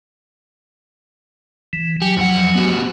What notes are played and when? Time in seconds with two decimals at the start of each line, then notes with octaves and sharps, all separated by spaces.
1.73 E3
2.02 F#3 G4 G#5
2.17 F2 F#5
2.55 B3 F#4 G4